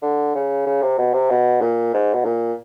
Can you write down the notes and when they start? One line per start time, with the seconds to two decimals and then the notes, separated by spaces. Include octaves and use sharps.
0.02 D3
0.35 C#3
0.66 C#3
0.82 C3
0.98 B2
1.13 C3
1.30 B2
1.61 A#2
1.93 G#2
2.14 B2
2.25 A#2